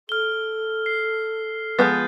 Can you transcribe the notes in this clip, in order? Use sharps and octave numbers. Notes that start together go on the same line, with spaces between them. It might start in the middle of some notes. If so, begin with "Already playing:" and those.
A4 F6 G7
C7
F3 G#3 B3 G6 A6